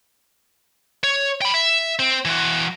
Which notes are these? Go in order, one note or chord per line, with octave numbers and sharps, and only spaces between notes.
C#5
G5 B5
E5
C4
E3 F#4